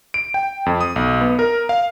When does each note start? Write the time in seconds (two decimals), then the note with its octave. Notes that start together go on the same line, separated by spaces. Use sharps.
0.14 D7
0.34 G5
0.66 F2
0.81 D#6
0.96 B1
1.21 B3
1.39 A#4
1.69 F5